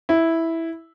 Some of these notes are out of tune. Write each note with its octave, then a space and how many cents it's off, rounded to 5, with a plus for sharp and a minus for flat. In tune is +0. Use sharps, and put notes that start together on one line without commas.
E4 -5